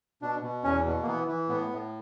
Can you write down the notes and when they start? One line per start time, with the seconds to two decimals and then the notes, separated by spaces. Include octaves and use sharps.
0.22 B2 D4
0.43 B2
0.64 E2 C#4
0.86 B2
1.02 A#3
1.07 E3 B3
1.28 E3
1.49 A2 B3
1.71 A2